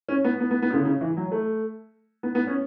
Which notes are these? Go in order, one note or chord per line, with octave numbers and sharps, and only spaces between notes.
C#4
B3
B3
B3
B3
C#3
D3
C#3
E3
F#3
A3
B3
B3
C#4